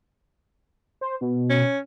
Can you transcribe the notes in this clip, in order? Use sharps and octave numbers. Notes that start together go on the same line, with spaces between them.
C5
B2
C#4